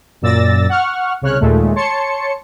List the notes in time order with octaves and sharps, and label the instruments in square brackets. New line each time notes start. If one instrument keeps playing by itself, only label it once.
[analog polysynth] F#2 A#2 D5 E6 A6 A#6
F#5 C#6 F6
C2 C#3 C#5 F6 F#6
D#2 A#2 G#3 A3
C#5 A5 C6 C#7